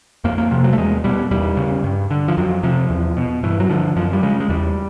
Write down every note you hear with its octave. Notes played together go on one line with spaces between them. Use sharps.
F2 A#3
A#3
C3 F3
F#3
A3
E2 G#3
B2 G3
E2 G3
C#3
G2
D3
F3
F2 F#3
C3 F3
E2
B2
G2 E3
F#3
D3 F3
F#2 F3
G3
C#3 G#3
G#3
E2 G3